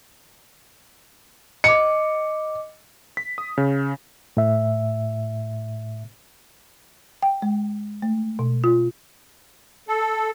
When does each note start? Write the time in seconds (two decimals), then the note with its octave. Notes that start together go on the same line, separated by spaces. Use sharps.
1.64 D#5 D6 C#7
3.17 B6
3.38 D#6
3.58 C#3
4.37 A2 E5
7.22 G5
7.42 G#3
8.02 A3
8.39 B2
8.64 F4
9.88 A4